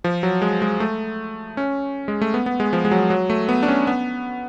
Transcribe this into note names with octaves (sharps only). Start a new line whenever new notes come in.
F3
F#3
G#3
G#3
A3
C#4
G#3
A3
B3
B3
G#3
F3
G#3
F#3
F#3
A3
B3
D4
C#4
B3